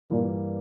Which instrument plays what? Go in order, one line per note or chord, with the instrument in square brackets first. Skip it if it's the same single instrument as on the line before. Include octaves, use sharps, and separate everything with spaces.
[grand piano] G2 E3 G3 A#3 [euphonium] A#2